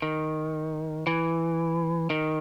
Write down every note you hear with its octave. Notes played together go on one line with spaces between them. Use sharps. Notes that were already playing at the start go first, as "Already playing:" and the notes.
D#3
E3
D#3